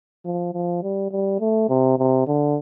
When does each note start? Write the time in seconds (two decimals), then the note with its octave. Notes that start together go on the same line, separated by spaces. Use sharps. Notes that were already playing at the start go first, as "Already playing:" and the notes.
0.25 F3
0.53 F3
0.83 G3
1.11 G3
1.40 A3
1.69 C3
1.98 C3
2.27 D3